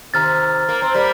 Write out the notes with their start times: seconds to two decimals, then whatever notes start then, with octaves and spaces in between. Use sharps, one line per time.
0.14 C3 D#3 A#5 F6 A6
0.69 A#3
0.82 C4
0.95 G3 A#3